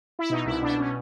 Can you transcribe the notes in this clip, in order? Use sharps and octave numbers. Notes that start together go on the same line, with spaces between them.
E4
B2 D#4
C2 E4
B2 D4
B2 C#4